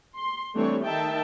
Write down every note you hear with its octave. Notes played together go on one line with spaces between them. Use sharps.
C6
E3 G3 A3 C4 D4 C#5
D#3 D#4 E5 G5 A5